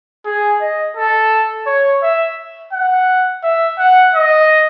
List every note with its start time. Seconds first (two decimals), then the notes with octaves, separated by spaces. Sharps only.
0.25 G#4
0.61 D#5
0.97 A4
1.66 C#5
2.03 E5
2.73 F#5
3.43 E5
3.78 F#5
4.14 D#5